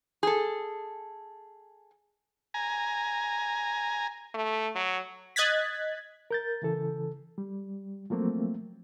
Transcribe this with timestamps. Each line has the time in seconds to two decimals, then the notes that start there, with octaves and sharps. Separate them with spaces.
0.23 G#4 A4
2.54 G#5 A#5
4.34 A3
4.75 F#3
5.36 D#5 F#6 G#6 A6 B6
6.31 A#4 G6 A6
6.62 C#3 E3 A4
7.38 G3
8.10 F3 F#3 A3 A#3 C4